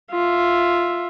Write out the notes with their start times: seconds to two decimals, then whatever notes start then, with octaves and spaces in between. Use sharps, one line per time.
0.11 F4 E5